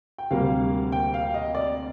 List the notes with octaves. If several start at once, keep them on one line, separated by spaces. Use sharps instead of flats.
G5
D2 C3 G3 A#3 F5
G5
F5
D#5
D5